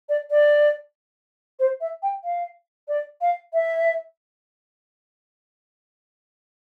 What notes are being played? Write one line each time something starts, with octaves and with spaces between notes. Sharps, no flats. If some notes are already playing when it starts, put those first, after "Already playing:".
D5
D5
C5
E5
G5
F5
D5
F5
E5